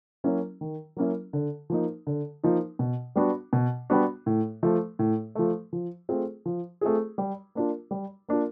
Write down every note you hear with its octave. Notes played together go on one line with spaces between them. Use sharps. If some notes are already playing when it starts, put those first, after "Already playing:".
F#3 A#3 C#4 E4
D#3
F#3 A#3 C#4 E4
D3
F3 A#3 D#4
D3
F3 A#3 D#4
B2
G3 B3 D4 F#4
B2
G3 B3 D4 F#4
A2
F3 A3
A2
F3 A3
F3
A3 C4 F4 G#4
F3
A3 C4 F4 G#4
G3
A#3 D4 F4
G3
A#3 D4 F4